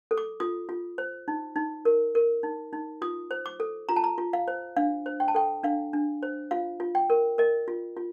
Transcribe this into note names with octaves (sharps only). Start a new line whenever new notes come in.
A4
D6
F4 D#6
F4
C5
D#4
D#4
A#4
A#4
D#4
D#4
F4 D#6
C5
D6
A4
F4 A#5
A5
A#5
F4
F5
C5
D4 F5
C5
G5
A5
A4 G5
D4 F5
D4
C5
F4 F5
F4
G5
A#4
A#4 D#5
F4
F4